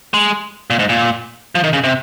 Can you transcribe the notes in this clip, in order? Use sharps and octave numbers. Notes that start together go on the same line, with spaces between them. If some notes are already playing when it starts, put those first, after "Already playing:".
G#3
A#2
G#2
A#2
F3
D#3
C#3
C3